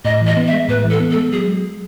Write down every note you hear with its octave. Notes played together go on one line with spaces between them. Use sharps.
A2 D#5
E3
D#5
B3
E5
G#3
A2 B4
E3
A4
B3
A4
G#3
F#3 G#4